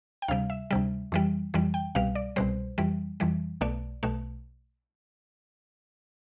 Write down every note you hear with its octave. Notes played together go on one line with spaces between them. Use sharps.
G5
D2 C3 G3 F5
E5
D2 C3 G3
F2 E3 G3
F2 E3 G3
G5
C2 B2 G3 F5
D5
C2 B2 G3 C5
F2 E3 G3
F2 E3 G3
B1 B2 A3 D5
B1 B2 A3